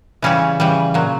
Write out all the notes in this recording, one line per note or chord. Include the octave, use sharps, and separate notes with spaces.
C#3 E3 G3 C#4 E4
C#3 E3 G3
A#2 F#3